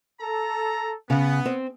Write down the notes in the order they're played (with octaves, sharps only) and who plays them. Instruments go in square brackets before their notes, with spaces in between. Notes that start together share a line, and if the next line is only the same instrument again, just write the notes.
[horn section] A4 A#5
[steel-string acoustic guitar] C#3 [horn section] B3
[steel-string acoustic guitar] C4